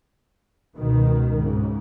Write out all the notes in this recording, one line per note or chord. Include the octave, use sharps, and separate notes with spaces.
C#2 B2 D#3
G#2 C#3